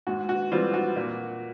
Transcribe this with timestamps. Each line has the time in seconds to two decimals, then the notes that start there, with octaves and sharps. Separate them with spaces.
0.07 G#2 F#4
0.29 F#4
0.52 E3 G3 C4 F4
0.74 F#4
0.96 A#2